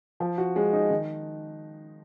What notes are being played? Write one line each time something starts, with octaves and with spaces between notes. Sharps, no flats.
F3
F#4
G#3
D#4
D#3